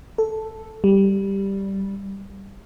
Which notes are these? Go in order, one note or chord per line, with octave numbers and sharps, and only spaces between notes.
A4
G3